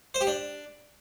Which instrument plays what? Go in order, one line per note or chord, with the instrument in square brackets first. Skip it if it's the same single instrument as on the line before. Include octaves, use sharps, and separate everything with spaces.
[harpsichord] C5
G4
D4